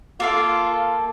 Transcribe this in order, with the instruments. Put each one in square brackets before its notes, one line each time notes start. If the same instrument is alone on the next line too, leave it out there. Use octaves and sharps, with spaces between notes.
[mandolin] A#3 A4 F5 [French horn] F4